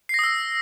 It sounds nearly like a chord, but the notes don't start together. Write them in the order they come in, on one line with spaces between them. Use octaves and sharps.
C7 A#6 D#6 E6